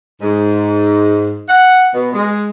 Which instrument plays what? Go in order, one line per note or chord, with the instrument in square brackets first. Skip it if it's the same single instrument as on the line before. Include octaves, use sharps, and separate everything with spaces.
[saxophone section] G#2
F#5
B2
G#3